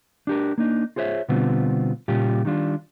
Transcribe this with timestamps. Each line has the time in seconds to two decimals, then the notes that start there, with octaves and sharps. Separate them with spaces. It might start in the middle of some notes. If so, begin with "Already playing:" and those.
0.27 D4 G4 A#4
0.58 A#3 D4 D#4
0.96 F4 G#4 C5 C#5 E5
1.29 B2 D3 G3 B3 C4 F4
2.08 A#2 C#3 G3 F4 G4
2.45 D#3 G3 D4 F4